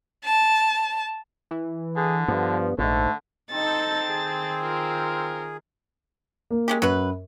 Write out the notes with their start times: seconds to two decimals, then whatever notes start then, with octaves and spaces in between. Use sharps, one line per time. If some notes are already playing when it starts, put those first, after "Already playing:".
0.24 A5
1.51 E3
1.96 D3 G#4
2.28 G2 F3 B3
2.78 A#1 G#2 D3 A3
3.51 C4 D#4 A4 D#5 A5 A6
4.09 D#3 G#4
4.62 F4 A#4
6.51 A#3
6.68 G#3 C#4 G4
6.82 F#2 F#3 B4